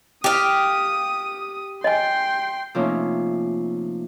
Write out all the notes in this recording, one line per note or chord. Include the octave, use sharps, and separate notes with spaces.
G4 F5 D#6
D#5 G5 G#5 C6
C3 F3 A3 A#3 C#4 D#4